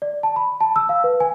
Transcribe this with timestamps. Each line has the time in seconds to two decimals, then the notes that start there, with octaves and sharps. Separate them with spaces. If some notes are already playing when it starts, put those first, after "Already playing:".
0.02 D5
0.23 A5
0.36 B5
0.60 A5
0.76 E6
0.89 F5
1.04 B4
1.20 G#5